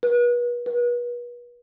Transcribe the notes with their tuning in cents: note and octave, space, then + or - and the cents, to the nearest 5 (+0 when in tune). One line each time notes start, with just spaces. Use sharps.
B4 -35
B4 -35